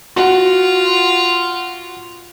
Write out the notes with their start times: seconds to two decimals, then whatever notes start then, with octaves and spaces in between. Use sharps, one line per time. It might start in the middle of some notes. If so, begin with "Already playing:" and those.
0.16 F4 F#4 F#5